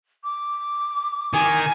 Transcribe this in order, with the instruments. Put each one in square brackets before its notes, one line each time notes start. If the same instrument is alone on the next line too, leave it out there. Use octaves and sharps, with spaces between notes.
[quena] D6
[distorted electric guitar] D#3 [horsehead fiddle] G#5